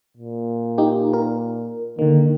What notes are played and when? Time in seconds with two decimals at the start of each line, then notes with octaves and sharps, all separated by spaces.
0.17 A#2
0.78 D#4 G4
1.13 A#4
1.99 D3 D#3 A#3